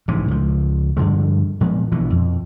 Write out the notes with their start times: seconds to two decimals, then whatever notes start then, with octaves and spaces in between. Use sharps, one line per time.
0.08 A#1 G#2 C3 E3
0.28 C#2 F3
0.97 G2 D3 F3 G#3
1.61 A#2 F3 G#3 B3
1.92 A#1 B2 E3 F3
2.10 F2